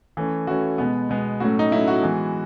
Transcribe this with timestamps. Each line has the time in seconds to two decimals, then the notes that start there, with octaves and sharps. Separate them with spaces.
0.17 E3 A3 C#4
0.47 E3 A3 C#4 F#4
0.78 B2 G#3 B3
1.09 B2 G#3 B3
1.40 A2 F#3 A3 C#4 F#4
1.59 D#4
1.71 A2 F#3 A3 C#4 E4
1.88 F#4
2.02 E3 G#3 B3